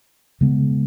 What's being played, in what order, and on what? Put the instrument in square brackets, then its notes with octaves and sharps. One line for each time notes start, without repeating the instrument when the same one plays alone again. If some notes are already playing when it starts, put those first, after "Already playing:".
[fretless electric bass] C#3 G#3 B3